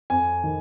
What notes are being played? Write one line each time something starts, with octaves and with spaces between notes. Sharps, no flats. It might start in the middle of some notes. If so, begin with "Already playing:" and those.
F2 G#5
D#3